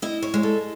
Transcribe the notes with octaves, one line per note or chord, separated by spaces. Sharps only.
E4 D#5
C#5
G#3
A4